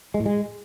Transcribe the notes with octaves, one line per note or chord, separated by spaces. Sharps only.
G#3
A2
G#3